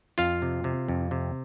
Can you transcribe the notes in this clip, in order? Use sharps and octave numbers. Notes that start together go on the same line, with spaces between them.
F2 F4 F5
C3
C3
F2
C3